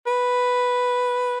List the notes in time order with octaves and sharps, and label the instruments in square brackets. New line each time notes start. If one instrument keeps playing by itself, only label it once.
[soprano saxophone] B4